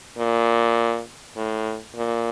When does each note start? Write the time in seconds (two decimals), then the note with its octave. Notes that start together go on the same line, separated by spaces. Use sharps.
0.18 A#2
1.36 A2
1.96 A#2